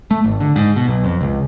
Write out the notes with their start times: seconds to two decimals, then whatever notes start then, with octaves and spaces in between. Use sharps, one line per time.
0.11 A3
0.24 G#1
0.40 D3
0.56 G#2
0.76 B2
0.88 B1
1.04 F2
1.21 C#2